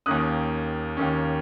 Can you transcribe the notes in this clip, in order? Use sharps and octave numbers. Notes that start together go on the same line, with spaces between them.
D#2 D#3 A#3 C#4 D#6 F#6
D#2 D#3 A#3 C#4